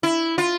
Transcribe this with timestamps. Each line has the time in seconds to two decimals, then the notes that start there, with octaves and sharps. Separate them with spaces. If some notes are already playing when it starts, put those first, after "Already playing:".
0.03 E4
0.38 F4